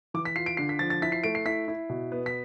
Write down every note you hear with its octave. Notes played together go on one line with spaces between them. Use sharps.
E3 D6
B6
F4 C7
D7
D3 C7
B6
F3 A6
A6
E4 B6
C7
A3 D7
C7
E4 B6
E4
B2
B3
B6